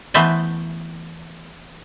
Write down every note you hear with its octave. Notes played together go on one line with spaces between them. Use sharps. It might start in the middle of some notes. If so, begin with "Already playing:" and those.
E3 A3 B3 B4 C5 G#5